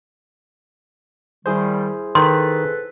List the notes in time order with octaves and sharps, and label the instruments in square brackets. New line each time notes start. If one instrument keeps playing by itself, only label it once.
[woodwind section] D#3 G3 [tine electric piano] E4 G#4 C5
[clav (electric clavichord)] D#3 [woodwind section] A4 B4 [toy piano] C6